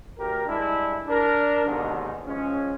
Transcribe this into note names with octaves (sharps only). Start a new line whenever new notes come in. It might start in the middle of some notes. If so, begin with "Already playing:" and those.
D2 G4 A#4
G2 G#3 D4 E4
D4 A#4
D#2 G#2 B2 D3 D#3
F3 G#3 C#4